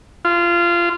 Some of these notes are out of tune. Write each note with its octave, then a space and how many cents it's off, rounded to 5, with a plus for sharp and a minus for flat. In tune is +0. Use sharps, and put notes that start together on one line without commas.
F4 -20